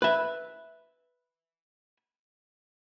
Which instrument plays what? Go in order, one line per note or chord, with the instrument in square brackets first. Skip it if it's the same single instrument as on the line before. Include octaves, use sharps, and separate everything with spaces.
[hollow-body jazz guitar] B4 E5